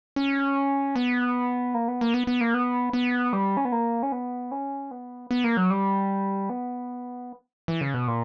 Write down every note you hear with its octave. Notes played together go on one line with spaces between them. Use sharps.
C#4
B3
A#3
B3
A#3
B3
B3
A#3
B3
B3
G3
C#4
B3
A#3
C#4
B3
C#4
B3
B3
A#3
F#3
G3
B3
E3
C#3
B2
A#2